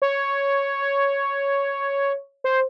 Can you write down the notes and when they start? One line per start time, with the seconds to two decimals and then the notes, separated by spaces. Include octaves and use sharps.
0.02 C#5
0.82 C#5
2.44 C5